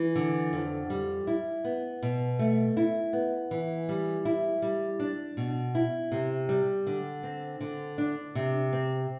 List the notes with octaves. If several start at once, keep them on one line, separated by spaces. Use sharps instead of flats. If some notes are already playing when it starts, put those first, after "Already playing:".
Already playing: E3
D3
F2
G3
E4
B3
B2
A3
E4
B3
E3
G3
E4
G3
D4
B2
E4
C3
G3
D3
C4
D3
D4
C3
C4